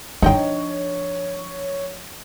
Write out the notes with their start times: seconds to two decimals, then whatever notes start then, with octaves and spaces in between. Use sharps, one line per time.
0.22 F3 D4 D#4 C#5 D#5 G5